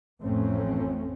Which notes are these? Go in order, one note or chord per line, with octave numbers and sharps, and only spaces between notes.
A1 F2 A3 C4 C#4